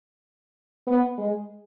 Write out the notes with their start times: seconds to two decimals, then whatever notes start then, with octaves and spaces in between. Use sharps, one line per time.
0.87 B3
1.18 G#3